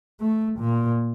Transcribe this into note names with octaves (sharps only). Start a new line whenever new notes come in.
A3
A#2